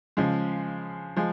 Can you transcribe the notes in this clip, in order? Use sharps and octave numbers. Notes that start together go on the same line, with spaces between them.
C#3 F3 G#3
F3 G#3